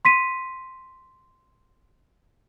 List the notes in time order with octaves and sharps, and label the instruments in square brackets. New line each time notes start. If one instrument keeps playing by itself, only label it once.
[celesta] C6 B6 D#7